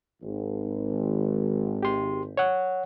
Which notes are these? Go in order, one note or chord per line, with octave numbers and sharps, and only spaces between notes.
G#1
G4 C6
C#5 F#5